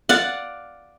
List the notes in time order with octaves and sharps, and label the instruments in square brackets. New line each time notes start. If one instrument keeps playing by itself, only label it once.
[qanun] D5 F5 F#5